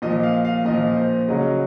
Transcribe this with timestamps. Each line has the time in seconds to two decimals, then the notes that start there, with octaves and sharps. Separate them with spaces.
0.02 A#2 F3 D#5
0.23 F5
0.45 F5
0.65 A#2 F3 D#5
0.97 C5
1.28 C#3 F#3 D#5